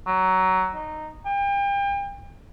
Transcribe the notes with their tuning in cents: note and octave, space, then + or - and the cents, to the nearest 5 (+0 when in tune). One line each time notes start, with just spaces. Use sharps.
F#3 +15
D#4 -10
G5 +35